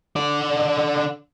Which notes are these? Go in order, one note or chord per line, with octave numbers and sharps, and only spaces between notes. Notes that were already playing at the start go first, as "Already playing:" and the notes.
D3 D5